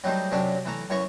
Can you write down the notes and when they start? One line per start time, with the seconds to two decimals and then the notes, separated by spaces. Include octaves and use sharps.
0.04 F#3 G3 A3 D#4 C5
0.32 F#2 C3 F#3 C#4 D4
0.65 E3 A3 A#5
0.90 F#2 E3 C#5 A#5 C#6